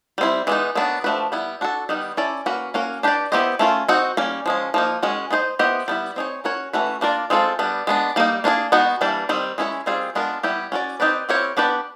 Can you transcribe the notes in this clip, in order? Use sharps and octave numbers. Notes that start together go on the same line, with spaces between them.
G3 C4 E4
E3 G#3 B3 D#4
D#3 F#3 B3 D4
F3 A3 D4 F#4 B4
G3 B3 E4
D4 F#4 A4
D#3 G3 B3 D#4
C#4 E4 A4 D5
A#3 C#4 F#4 B4
A#3 C#4 F#4 A#4
D4 G4 B4 D5
B3 E4 G4 C5 D#5
A3 C#4 F4 A#4
C4 D#4 F#4
G3 A#3 C#4
F3 G#3 C#4
F3 A#3 D#4
D#3 G#3 C#4 F#4
B3 D#4 G#4 C5 D#5
B3 E4 G4 C5 D#5
G3 B3 E4
C4 D#4 G#4 C#5
C#4 F#4 A#4 C#5
E3 A3 C#4 F#4 B4
A#3 D4 F4 A#4 D5
G#3 C4 F4 A4
G3 B3 D4
G#3 B3 D4
G3 A#3 D#4
A#3 D4 F4 G#4
G#3 B3 D#4 F#4
E3 G3 A#3 D4
D#3 G3 C4
G#3 C#4 E4 G#4 C#5
D#3 G3 C4 F4 G#4
G#3 B3 D4 F4 A#4
G3 B3 E4 G4
C#4 F#4 A4 D5
C4 D#4 G4 B4 D5
C4 E4 G4 A#4 C#5
B3 D4 G4 B4 D5